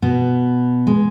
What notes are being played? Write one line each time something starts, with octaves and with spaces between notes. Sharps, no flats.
B2 B3
G#3